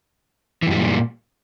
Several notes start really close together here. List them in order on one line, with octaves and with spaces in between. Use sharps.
E3 F#2 G3 A#2